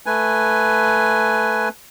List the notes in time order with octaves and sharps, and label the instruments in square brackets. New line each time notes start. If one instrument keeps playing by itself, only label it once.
[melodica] A3 B4 G#5